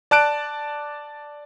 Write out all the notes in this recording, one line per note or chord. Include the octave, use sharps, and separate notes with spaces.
D5 A5 F#6 D7